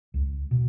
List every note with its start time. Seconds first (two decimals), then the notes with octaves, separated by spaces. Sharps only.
0.14 C#2
0.51 B2